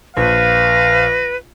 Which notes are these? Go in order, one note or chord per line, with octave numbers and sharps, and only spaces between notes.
A#1 B4 F5 A#6